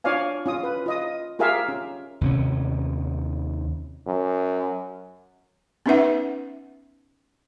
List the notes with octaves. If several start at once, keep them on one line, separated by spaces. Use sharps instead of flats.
D4 F4 C#5 D5 F5 G#5
C#4 F4 D#6
B4
F4 D#5 D#6
F4 G4 G#4 A#4 E5 F5
C#4
D#2 C3 C#4
F#2
B3 C#4 D#4 B4 E5 F#5